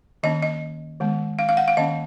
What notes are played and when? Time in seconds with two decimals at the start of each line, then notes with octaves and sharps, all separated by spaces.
0.23 D#3 A#3 C#4 D#5
0.42 D#5
1.00 D#3 G#3 B3
1.39 F5
1.49 F5
1.57 F#5
1.68 F5
1.77 D#3 A#3 C#4 D#5